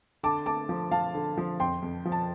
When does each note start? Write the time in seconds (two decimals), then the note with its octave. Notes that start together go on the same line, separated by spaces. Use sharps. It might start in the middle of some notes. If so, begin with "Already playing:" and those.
0.23 D3 A5 D6
0.46 A3 A5 D6
0.69 F3
0.91 F3 F5 A5
1.14 D3
1.37 F3
1.60 F2 G5 C6
1.83 F2
2.05 F3
2.12 A5